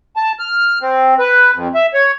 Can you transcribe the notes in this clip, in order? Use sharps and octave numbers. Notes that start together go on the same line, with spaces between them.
A5
F6
C4
B4
F2
E5
C#5